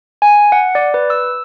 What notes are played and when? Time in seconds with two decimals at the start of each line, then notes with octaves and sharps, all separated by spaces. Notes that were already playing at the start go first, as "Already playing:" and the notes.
0.22 G#5
0.52 F#5
0.75 D5
0.94 B4
1.10 E6